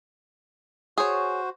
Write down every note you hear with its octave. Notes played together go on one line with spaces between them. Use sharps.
F#4 G#4 C5 C#5